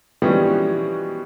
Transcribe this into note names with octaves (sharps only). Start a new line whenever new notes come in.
B2 E3 F3 G3 G#3 C#4